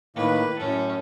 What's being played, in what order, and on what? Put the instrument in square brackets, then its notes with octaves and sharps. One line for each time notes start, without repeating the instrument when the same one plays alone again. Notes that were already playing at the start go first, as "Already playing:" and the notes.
[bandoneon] A2 D#3 A#3 [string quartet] B4
[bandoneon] F#2 A2 [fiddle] C#4 [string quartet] A4